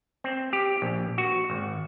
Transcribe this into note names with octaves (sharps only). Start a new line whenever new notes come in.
C4
G4
A#1
F#4
G#1